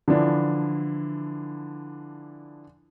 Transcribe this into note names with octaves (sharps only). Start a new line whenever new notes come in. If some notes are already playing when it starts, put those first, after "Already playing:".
D3 E3 F3 D4 E4